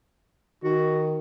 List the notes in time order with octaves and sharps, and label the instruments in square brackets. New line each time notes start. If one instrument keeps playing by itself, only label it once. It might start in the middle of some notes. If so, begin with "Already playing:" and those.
[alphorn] D#3 [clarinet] F#4